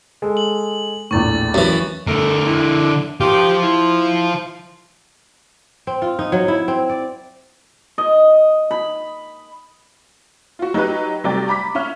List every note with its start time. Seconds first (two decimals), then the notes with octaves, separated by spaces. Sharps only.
0.22 G#3 A4
0.37 F#7
1.11 A#1 E2 A2 C#6 A6
1.54 F#2 E3
2.07 D3 A3 A#4
2.46 E4
3.21 F4 G4 C5
3.62 E4
5.87 C4
6.02 F4
6.19 D#4
6.32 F#3
6.48 E4
6.68 C4
6.89 D5
7.98 D#5
8.71 B5
10.59 F4 F#4
10.74 F#3 D#4 G4 B4 F#6
11.24 C3 F#3 G3 A3 D5 G5
11.48 A#5 B5 D6 B6
11.75 C#4 E5 F6